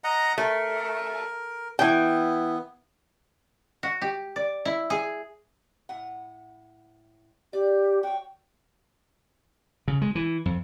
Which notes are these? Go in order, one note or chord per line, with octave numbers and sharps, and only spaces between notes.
D#5 F#5 A#5
A3 A#4
E3 B3 G5
F#4
G4
D5
E4
G#4
A2 F#5
G4 D5
F#4 C#5 G5
C#3
G#3
E3
F2